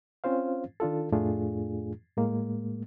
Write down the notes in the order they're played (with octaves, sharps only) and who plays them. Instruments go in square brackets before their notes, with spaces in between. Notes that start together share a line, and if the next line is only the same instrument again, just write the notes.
[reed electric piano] C4 C#4 F4 C5 F5
D#3 D4 F4 A4
F2 A2 A3 D4 F4 G#4
A2 G#3 A#3